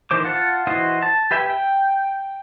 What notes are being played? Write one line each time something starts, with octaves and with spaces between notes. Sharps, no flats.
D#3 E3 C5 D6
F4 F#5 A5
E3 E4 F#4 C5 D#5
A5
G4 B4 E5 G5 G#5
G5